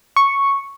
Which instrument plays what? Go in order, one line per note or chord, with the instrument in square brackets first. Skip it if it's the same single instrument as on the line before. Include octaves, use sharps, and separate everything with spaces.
[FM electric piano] C#6